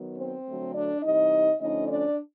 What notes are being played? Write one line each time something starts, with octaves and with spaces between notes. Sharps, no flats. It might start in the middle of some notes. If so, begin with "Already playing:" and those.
Already playing: D#3 F#3 B3
C4 C5
D3 F#3 A3
D4 D5
C3 E3 G3 D#4 D#5
D3 F3 A3 C#4 D#4 D#5
D4 D5